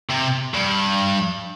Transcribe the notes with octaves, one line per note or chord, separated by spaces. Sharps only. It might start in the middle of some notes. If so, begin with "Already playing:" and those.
C3
G2